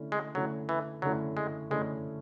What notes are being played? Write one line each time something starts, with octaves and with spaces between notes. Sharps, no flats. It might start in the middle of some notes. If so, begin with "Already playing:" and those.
Already playing: D3 A3 C#4 E4
G#3
D3 F#3 A3 C#4 E4
E3
D3 F#3 A3 C#4 E4
G#3
D3 G#3 A3 C#4 E4